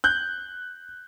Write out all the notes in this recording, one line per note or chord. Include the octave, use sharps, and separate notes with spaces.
F#6 G6